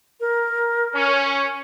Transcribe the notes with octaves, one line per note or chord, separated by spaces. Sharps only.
A#4
C#4